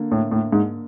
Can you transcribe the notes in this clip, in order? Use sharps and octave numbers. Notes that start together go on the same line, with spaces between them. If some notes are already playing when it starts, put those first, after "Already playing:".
Already playing: D3 A#3
A2
A2
G#2